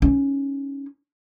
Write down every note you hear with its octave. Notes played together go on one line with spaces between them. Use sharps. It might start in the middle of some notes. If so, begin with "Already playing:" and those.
C#4 D#4